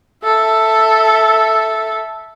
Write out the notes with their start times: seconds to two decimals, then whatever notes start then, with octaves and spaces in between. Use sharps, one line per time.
0.24 A4 E5